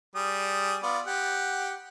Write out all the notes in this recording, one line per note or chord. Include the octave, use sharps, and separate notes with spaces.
G3 G#4 D#6
B3 F4 D5
G4 F#5